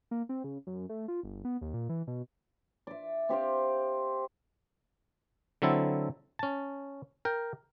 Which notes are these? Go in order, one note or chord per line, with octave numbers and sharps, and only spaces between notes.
A#3
C4
C#3
F#2
A3
F4
G1
B3
D#2
A#2
E3
B2
D5 E5
C4 G4 C5 F5
D3 F#3 C4 E4 A4
C#4 A5
A#4 G5